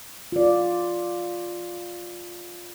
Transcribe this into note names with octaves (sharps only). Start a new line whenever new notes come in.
F4 D5